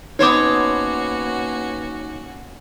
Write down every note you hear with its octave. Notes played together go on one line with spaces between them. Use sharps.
A#3 B3 C#4 D#4 F#4 C5 C#5 D6